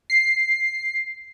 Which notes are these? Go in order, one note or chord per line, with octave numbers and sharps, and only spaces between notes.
C7